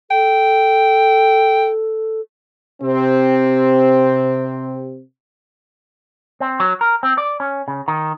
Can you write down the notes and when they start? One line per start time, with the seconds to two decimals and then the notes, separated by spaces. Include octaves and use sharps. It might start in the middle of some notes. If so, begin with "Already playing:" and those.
0.11 A4 G5
2.83 C3 C4
6.40 C4
6.60 F#3
6.81 A#4
7.03 C4
7.18 D5
7.40 C#4
7.68 C#3
7.88 D#3